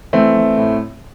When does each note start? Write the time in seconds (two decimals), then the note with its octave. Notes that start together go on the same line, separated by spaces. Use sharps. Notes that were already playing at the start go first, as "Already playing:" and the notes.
0.13 E3 A3 C4
0.35 E3
0.57 A2